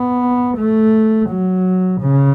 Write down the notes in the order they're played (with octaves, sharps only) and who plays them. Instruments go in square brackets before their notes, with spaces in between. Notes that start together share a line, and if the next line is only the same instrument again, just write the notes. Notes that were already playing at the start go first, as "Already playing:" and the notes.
Already playing: [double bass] B3
A3
F#3
C#3